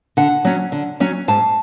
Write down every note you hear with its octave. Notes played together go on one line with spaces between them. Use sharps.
D3 F#5
F#3 C#4
D3
F#3 C#4
G#2 A5